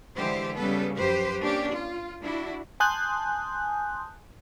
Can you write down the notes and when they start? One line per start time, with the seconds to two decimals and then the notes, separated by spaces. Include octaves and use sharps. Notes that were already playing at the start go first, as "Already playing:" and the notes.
0.14 D3 E3 G#3 G4 C5
0.55 C#3 G3 B3 A4 B4
0.97 F#2 F3 G4 B4 C5
1.40 A#3 C#4 D4 G4 D5
1.72 F4
2.22 D4 E4 F#4
2.80 G#5 A5 C6 D#6 F#6 G6